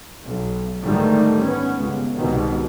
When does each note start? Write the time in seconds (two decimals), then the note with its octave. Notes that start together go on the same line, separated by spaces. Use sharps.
0.26 B1
0.82 G#2 D3 D#3 G3 A3
1.42 B3 C#4
1.78 G1 C#2
2.17 C2 G#2 B2 D#3